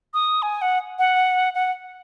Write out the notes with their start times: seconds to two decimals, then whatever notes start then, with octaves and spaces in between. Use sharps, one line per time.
0.14 D#6
0.42 G#5
0.62 F#5
0.99 F#5
1.54 F#5